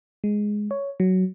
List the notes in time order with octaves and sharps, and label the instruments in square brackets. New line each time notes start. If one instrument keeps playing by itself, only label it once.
[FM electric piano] G#3
C#5
F#3